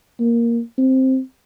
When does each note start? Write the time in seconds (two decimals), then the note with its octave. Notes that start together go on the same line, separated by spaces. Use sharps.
0.20 A#3
0.78 C4